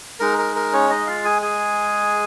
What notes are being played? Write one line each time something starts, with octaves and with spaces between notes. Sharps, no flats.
G#3 D#4 A#4
A#4
A#4
C#4 C#5
D#4 D#5
F4 F5
G#4 G#5
G#4 G#5